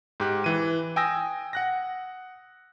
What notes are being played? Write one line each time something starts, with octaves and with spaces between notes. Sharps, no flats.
G#2 G4 F#6
E3 D#7
G5 G#5 D#6 E6 A#6
F#5 F#6 A#6